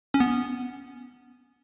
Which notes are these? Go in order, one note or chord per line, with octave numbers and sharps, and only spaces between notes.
C#4
B3